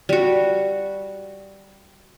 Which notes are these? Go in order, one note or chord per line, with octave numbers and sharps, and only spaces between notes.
G3 F#4